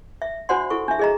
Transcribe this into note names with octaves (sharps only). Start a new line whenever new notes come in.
E5
D4 F#4 C5 D5 F#5 C6
E4 A4 C#6
D4 E5
G#4 D#5 A#5